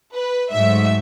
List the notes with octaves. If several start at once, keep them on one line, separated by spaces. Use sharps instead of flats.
B4
G#2 F#3 A3 E5